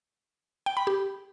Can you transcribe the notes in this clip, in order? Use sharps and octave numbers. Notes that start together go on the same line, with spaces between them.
G5
B5
G4